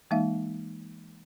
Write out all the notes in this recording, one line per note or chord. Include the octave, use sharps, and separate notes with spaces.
E3 G#3 A#3 D#4 E5 F5